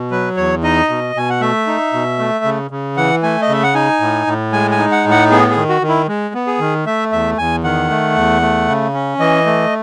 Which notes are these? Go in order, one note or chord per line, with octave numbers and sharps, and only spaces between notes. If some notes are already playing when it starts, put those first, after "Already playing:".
Already playing: B2
F#3 B4
E2 C#5
D#4 D#5
B2
B2 G#5
F#5
A3 E5
D#4
B2
A3
C#3
C#3
E3 F#5
A3 G#5
D#5
C#3 E5
F#5
D#4 G#5
A2
A2
G#3 G#5
G#5
D#4
F#5
A2
F#5
B3 G#4
G#4
D#3
F#4
D#3
E4
G#3
B3
G#4
D#3
A3 E5
E2 E5
E2 G#5
D#3 F#5
A3
E2
A3
C#3
C#4
E3 D#5
A3